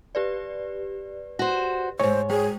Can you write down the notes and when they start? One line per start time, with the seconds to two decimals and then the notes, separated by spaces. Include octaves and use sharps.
0.15 G4 B4 D5
1.39 F#4 C5
2.00 D2 G#2 C5 C#5
2.29 G#3 G#4 C5 G5